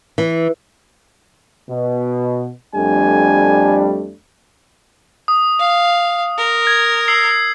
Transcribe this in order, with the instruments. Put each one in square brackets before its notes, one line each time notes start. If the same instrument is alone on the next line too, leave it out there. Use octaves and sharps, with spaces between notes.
[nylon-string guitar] E3
[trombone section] B2
[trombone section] F2 A3 D4 [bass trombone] G3 [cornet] G#5
[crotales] D#6
[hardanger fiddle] F5
A#4
[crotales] G#6
E6 C7